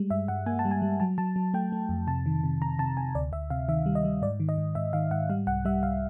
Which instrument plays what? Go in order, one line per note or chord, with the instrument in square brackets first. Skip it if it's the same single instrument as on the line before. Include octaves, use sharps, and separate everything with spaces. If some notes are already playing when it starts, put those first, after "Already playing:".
Already playing: [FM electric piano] G3 G#3
G2 E5
G2 F#5
A#3 G#5
A5
G3
G#5
G3
F#3 A5
F#3 A5
F#3
A3 G5
A3
F2
C3 A5
D#3
C3
C3 A#5
C3 A5
C3 G#5
D2 D5
D2 E5
C3 F5
D#3 E5
G3
D#5
G3
G#2 D5
D#3
D#5
G#2
G#2 E5
D#3 F5
G#2 F#5
G3 F5
C2 F#5
G3 E5
C2 F5